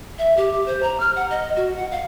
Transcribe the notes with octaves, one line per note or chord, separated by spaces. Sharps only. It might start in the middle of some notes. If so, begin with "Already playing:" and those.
E5
G4
C5
A#5
F6
F#5
D#5
F#4
F#5
F5